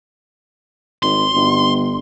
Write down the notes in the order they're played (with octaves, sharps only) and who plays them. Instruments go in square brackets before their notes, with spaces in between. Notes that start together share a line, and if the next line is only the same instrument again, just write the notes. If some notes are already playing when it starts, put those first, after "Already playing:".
[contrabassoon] G#1 [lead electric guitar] C6
[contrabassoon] G1